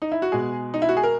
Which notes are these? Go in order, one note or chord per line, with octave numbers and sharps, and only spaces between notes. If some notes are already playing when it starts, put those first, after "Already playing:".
D#4
E4
F#4
B2 G#3 G#4
D#4
E4
F#4
G#4
A#4